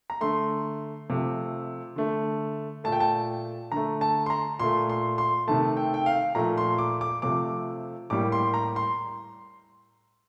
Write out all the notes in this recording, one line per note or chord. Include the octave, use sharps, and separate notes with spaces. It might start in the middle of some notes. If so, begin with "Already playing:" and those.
A#5
D3 A3 C6
C3 F3 A3
D3 A3
A#2 A3 A5
G5
A5
D3 A3 A#5
A5
C6
A#5
A#2 A3 C6
C6
C6
C3 D#3 A3 A5
G5
G5
F5
A#2 F3 A3 A#5
C6
D6
D6
C3 F3 A3 D6
A2 G3 A#3 D6
C6
A#5
C6